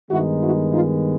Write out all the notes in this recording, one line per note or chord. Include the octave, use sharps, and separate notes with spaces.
G2 D#3 G#3 B3 D#4 E4 F#4
E4 F#4
D#4 F4